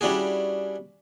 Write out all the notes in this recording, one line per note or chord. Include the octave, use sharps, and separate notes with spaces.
G3 C#4 D4 E4 F#4 G#4